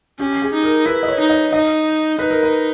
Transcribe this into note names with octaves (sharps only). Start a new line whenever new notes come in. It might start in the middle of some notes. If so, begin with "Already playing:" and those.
C#4 G4
G#4
D#4
A#4
E4 B4
D#5
C#5
D#4
D#5
D#4 D#5
D#4 B4
A#4
B4